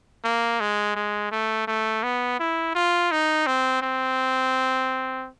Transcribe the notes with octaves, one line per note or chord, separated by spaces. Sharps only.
A#3
G#3
G#3
A3
A3
B3
E4
F4
D#4
C4
C4